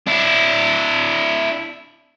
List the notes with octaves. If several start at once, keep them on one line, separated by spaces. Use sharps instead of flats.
D4 E4